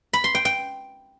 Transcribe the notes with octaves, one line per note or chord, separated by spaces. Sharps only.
B5
C6
G5
G5